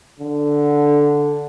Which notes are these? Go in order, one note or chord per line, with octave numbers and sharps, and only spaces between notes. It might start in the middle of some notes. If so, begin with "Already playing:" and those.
D3